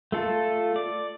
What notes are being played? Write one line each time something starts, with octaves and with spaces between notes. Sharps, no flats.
A3 F4 A4
D5